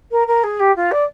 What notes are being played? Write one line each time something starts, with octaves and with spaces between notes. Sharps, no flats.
A#4
A#4
G#4
G4
F4
D5